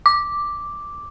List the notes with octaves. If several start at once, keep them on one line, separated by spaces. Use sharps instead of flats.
D6